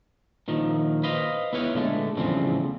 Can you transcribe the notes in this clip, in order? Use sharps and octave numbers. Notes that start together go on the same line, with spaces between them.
A#2 D#3 F3
B4 C5 D#5 F5
B3 E4 B4 C#5 F5
A#2 D3 G#3 A3
E2 A2 C#3 F3 G3 C4